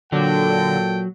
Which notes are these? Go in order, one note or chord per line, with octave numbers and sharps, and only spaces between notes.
A#2 D3 F#3 A4 G5